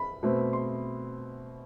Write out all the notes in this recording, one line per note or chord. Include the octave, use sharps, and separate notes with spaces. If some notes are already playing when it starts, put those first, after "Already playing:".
Already playing: B5
B2 A3 C4
C6